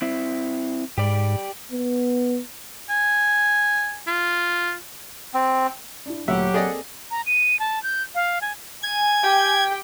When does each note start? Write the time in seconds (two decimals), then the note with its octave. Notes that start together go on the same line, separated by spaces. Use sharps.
0.02 C4 E4
0.98 G#2 G4 D5
1.71 B3
2.90 G#5
4.07 F4
5.34 C4
6.06 D4 E4
6.28 D2 A#2 F#3 G4 E5 F#5
6.54 A#3 C4 G#4 A4 D5 D#5
7.11 A#5
7.26 D#7
7.59 A5
7.83 G6
8.15 F5
8.41 G#5
8.83 G#5 G#6
9.23 G4 G5